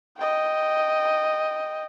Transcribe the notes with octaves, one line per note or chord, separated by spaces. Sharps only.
D#5 G5